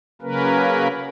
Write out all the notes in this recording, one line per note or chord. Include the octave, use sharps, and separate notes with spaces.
C#3 F#3 A#3 C#4 A#4 B4